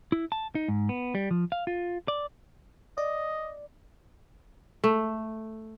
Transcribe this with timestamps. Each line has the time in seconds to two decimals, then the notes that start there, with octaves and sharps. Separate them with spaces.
0.12 E4
0.32 A5
0.55 D#4
0.68 G#2
0.89 B3
1.15 G3
1.31 F3
1.52 F5
1.67 F4
2.08 D5
2.98 D5 D#5
4.84 A3